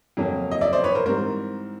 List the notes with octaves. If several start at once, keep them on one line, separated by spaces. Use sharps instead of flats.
F2 C#3 F#3 A#3 C#4
D#5
D5 E5
C5 D5
B4 C#5
A#4 C5
G#2 E3 G3 C4 A#4 C5